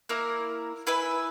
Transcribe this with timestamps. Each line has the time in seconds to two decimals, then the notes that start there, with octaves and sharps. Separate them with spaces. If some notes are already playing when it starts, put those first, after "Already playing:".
0.09 A#3 E4 A#4
0.87 E4 B4 E5 G#5